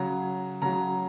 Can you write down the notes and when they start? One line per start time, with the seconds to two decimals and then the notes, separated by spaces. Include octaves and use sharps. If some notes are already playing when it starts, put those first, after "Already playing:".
Already playing: C#3 F#3 A#5
0.62 C#3 F#3 A#5